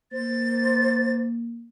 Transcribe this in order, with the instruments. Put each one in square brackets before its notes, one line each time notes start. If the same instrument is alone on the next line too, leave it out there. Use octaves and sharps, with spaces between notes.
[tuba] A#3 [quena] C5 [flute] A6